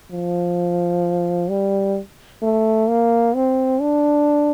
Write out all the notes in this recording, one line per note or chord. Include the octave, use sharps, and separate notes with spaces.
F3
G3
A3
A#3
C4
D4